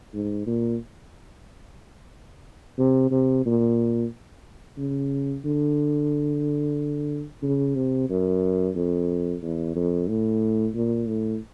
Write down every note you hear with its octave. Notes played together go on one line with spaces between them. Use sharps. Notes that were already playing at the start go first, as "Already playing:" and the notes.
G#2
A#2
C3
C3
A#2
C#3
D3
C#3
C3
F#2
F2
E2
F2
A2
A#2
A2